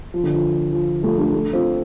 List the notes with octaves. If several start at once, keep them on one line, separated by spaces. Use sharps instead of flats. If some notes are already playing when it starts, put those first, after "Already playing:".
F3
D3
F3
F3
F3 A3
A3 D4
A3 D4
C4 F4